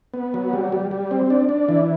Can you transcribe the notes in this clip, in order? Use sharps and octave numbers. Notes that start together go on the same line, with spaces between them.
B3
F#3
G3
G3
G3
C4
D4
D4
E3